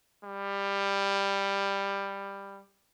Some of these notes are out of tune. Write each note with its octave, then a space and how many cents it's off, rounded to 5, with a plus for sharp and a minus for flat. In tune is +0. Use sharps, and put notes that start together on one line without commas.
G3 +15